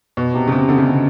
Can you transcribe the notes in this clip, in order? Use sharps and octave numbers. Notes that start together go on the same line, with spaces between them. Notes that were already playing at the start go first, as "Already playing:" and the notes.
B2
C3
C#3
C3
D3
C#3
C3